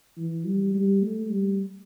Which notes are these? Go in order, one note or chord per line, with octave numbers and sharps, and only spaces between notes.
E3
G3
G3
A3
G3